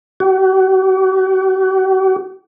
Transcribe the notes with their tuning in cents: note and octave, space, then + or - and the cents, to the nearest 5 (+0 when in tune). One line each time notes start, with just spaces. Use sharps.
F#4 +45